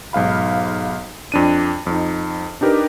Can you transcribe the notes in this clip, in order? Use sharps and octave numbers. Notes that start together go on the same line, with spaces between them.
B1 G#2 F5 B5
F2 D4 D#7
F2 D#4
D4 D#4 G4 A#4 B4